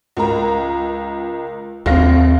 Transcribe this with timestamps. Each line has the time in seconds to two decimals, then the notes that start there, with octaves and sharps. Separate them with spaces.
0.17 C#2 A#4 A#5
1.86 A#1 D#2 C4 F5 A#6